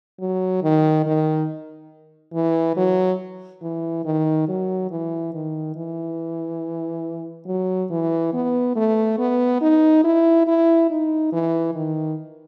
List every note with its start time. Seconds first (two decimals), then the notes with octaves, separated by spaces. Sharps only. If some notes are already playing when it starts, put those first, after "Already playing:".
0.20 F#3
0.63 D#3
1.06 D#3
2.34 E3
2.76 F#3
3.62 E3
4.05 D#3
4.48 F#3
4.91 E3
5.34 D#3
5.76 E3
7.47 F#3
7.90 E3
8.33 B3
8.76 A3
9.19 B3
9.61 D#4
10.04 E4
10.47 E4
10.90 D#4
11.32 E3
11.75 D#3